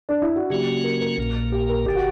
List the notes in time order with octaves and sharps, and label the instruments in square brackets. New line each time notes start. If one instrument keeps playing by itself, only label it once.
[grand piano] D4
E4
F#4
[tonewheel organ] C#3 F#3 A#3 C#4 F#4 [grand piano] G4
[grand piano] A#4
A#4
[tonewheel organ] A#1 A#2 A#3
[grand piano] G4
A#4
[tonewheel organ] G1 D3 [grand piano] G4
[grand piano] F#4